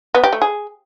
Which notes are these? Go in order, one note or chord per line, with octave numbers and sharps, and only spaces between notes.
B3
G4
A3
G#4